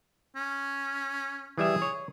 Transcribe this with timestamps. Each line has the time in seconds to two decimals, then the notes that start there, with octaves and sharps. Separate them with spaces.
0.35 C#4
1.58 E3 G3 G#4 E5
1.82 C#5